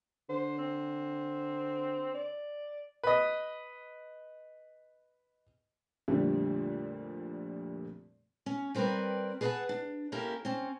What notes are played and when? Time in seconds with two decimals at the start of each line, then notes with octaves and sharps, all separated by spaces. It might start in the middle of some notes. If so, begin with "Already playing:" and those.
0.29 D3 C5
0.59 C4
2.15 D5
3.03 B4 D#5
6.08 F2 A#2 D3 G3 A3 C4
8.46 C#4
8.75 G3 C4 A#4 B4 D5
9.41 G#4 B4 D5 F5 F#5 A5
9.69 D4
10.12 A#3 C#4 E4 G4 A4 A#4
10.45 C4 C#4